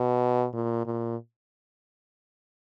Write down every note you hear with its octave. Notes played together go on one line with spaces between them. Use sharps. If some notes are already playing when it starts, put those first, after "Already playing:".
Already playing: B2
A#2
A#2